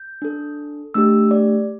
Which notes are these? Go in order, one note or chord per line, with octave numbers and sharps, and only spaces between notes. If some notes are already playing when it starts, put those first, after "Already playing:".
Already playing: G6
D4 A4
A3 D4 G4 E6
D5